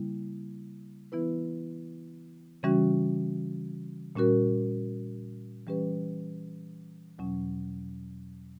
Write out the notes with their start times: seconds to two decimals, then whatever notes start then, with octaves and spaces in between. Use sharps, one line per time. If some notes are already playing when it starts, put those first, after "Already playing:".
Already playing: C#3 G3 A#3 E4
1.12 E3 B3 E4 B4
2.63 C#3 E3 G3 C#4 F#4
4.15 A#2 G3 C#4 F#4 A#4
5.67 E3 G3 C#4 G4 B4
7.19 E2 B2 F#3 C#4